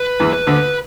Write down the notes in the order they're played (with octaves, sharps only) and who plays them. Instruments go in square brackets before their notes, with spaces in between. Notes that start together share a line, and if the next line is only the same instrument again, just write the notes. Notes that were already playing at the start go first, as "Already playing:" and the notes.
Already playing: [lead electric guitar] B4
[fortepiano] E2 E3
[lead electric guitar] B4
[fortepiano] D2 D3